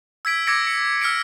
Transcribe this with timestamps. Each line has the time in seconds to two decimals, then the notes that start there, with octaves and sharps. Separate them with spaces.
0.25 E6 G#6 B6 D7
0.47 D6 E6 G#6 A#6 C#7 D7
0.67 C#7
1.01 E6 F6 B6 C#7 D7